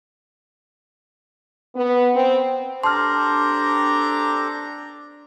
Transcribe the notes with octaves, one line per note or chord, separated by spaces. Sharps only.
B3
C4
D4 G4 A4 C5 A5 A#5 C6 F6